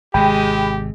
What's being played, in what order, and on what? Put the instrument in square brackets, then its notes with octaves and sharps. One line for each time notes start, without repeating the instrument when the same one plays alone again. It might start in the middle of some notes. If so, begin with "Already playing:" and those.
[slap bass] G#1 C3 [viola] G#3 [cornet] G4 [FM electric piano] G5 B5